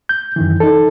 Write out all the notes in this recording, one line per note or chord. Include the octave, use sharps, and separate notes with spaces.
G6
F#2 D#3 E3
D#4 A4